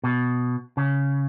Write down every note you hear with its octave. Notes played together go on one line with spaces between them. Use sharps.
B2
C#3